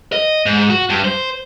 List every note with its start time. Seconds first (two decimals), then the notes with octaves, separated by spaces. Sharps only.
0.12 D#5
0.46 G#2
0.70 F#4
0.89 G2
1.04 C5